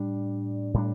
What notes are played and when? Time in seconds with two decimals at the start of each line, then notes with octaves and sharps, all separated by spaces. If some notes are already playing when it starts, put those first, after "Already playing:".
Already playing: A2 G3 D4
0.74 A2 G3 D4